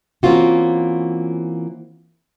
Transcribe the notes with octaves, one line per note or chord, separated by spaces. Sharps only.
E3 A#3 C4 C#4 F4 F#4